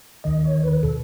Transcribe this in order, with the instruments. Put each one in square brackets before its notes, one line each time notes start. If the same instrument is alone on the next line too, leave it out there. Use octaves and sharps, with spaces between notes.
[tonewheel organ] D#2 D#3 D#5
C#5
B4
B2 A4